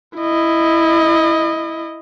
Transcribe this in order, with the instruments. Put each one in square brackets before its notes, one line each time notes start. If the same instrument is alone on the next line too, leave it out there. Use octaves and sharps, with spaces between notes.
[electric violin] E4 D#5